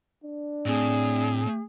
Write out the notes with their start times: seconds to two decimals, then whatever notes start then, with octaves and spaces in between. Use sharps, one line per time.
0.24 D4
0.66 A2 C4 G#4